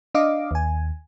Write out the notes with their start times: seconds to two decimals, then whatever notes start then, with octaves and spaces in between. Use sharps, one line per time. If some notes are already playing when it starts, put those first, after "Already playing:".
0.14 D4 D#5 F5 D6
0.51 D#2 G#5